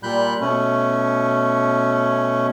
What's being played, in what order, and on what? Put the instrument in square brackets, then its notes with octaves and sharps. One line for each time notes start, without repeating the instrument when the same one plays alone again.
[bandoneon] A#2 G3 B5 F#6 G6
B2 A3 C#4